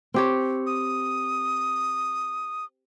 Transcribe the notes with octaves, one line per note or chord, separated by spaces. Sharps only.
C4 G4 C#5
D#6